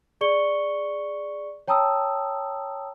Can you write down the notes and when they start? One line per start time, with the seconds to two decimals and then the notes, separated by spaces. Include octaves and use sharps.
0.21 G#4 D5 C#6 C#7 G7
1.68 C#5 G5 A5 A#5 D#6 E6